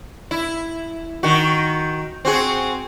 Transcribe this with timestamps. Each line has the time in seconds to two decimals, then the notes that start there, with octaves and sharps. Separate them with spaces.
0.31 E4
1.23 D#3 F#4
2.25 C4 F#4 G#4